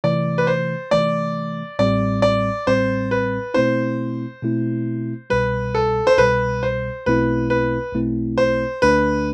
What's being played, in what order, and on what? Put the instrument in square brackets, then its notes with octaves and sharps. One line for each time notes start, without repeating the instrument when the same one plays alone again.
[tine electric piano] C3 E3 A3 [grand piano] D5
[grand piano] B4
C5
[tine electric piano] C3 E3 A3 [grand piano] D5
[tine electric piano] A1 A2 G3 C4 [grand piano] D5
[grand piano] D5
[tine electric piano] A1 A2 G3 C4 [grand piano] C5
[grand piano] B4
[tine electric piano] B2 A3 C4 E4 [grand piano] C5
[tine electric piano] B2 A3 C4 E4
[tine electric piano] C2 B2 G3 [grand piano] B4
[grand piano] A4
C5
[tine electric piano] C2 B2 G3 [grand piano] B4
[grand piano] C5
[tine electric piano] B1 B2 A3 C4 E4 [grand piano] B4
[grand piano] B4
[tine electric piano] B1 B2 A3 C4 E4
[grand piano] C5
[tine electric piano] D2 D3 A3 D4 [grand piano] B4